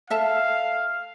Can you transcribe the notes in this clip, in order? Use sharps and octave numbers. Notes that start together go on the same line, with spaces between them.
A4 E5 F5 A5